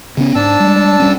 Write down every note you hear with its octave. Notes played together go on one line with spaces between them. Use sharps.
C#3 B3 C#4
G#2 D4 A5 E6
G3 G#3
E1 G3 C#4